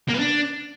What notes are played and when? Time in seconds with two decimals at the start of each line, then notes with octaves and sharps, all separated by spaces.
0.09 A#3
0.14 B3
0.19 D4